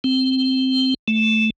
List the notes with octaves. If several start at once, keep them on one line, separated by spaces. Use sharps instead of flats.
C4
A3